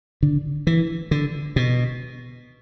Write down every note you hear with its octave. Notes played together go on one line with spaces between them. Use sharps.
D3
E3
D3
B2